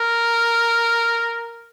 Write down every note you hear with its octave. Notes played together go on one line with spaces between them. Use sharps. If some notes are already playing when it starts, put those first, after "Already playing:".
Already playing: A#4